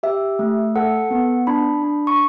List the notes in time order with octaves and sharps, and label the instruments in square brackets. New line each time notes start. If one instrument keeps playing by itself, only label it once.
[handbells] G4 E5
A3
A4 F#5
B3
D4 B5
D4
C#6